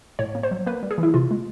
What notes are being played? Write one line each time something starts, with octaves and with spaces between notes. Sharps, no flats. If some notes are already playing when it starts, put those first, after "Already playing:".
A2 C#5
A#3
C5
F#3
A#3 B4
G3
G#4
E3
E4
C3 F4
G#3